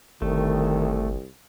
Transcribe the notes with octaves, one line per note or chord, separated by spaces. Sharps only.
G1 C2 D#3 A3